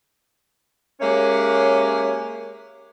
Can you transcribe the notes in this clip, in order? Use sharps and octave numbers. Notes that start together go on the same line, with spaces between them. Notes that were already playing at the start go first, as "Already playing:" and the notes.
G#3 A#3 C#4 G4 C#5 E5